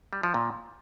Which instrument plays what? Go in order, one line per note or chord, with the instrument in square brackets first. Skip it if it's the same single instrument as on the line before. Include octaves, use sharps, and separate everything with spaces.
[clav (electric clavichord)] G3
F3
A#2